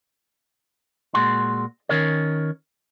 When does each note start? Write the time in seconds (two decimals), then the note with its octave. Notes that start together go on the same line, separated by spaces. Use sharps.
1.14 A#2 G#3 F#4 C6
1.89 D#3 C#4 A#4 C#5